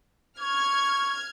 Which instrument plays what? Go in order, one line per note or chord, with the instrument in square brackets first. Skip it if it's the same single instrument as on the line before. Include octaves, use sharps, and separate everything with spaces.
[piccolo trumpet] C#6 [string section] F6 G#6